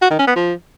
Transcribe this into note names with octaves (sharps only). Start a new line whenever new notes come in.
F#4
D#3
C#4
B3
F3